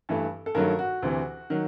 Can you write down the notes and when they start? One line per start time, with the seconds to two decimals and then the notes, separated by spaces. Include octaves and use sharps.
0.09 G2 E3 A3
0.46 A4
0.55 G2 D#3 F#3 A3 A#4
0.79 F#4
1.02 D2 C3 E3
1.50 D#3 F#3